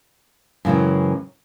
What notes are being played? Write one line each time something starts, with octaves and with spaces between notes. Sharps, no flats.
F#2 C#3 E3 G#3 C4